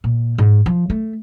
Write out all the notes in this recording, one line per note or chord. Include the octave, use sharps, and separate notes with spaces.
A#2
G#2
F3
A3